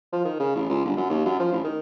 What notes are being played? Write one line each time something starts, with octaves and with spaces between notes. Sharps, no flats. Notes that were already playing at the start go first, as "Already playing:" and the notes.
F3
D#3
C#3
A1
C#2
G1
F#2
D#2
F#2
F3
A1
D#3